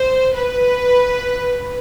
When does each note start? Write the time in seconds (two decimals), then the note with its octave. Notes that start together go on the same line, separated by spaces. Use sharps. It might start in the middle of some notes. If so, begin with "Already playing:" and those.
Already playing: C5
0.36 B4